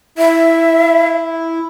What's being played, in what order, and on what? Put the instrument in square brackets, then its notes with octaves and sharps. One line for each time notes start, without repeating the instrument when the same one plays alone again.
[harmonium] E4 [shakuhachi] E5